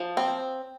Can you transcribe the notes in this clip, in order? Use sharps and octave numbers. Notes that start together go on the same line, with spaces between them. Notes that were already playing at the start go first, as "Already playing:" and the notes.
Already playing: F3
C4